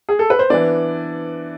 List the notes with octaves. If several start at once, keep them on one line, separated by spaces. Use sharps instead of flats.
G#4
A4
B4
C5
E3 B3 D4 D5